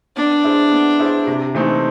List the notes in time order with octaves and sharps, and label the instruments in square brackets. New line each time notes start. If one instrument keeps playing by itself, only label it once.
[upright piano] B3 [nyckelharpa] D4
[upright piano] E4 G#4 C5
B3
E4 G#4 C5
C3
E3 A3 C4 D#4